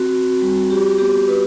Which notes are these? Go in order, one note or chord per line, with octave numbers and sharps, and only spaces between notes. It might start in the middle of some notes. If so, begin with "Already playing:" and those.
Already playing: C4 F#4
F#4
G3
F#4 G4
B3 G4
B3 B4